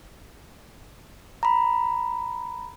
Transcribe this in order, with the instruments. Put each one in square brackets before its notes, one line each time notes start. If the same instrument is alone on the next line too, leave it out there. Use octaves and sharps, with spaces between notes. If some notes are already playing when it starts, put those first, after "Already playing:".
[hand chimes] A#5 B5